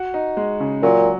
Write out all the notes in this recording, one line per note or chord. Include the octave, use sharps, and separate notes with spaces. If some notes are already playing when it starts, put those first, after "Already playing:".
Already playing: F#4
D#4
G#3
C#3
A#2 F#3